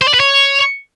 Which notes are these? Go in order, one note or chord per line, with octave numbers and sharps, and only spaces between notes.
C5
D5
B4
C#5